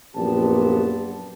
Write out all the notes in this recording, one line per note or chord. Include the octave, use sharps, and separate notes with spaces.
A#1 F#2 A#2 B3 G4 A5